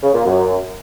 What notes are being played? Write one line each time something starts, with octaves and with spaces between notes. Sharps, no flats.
C#3
A#2
F#2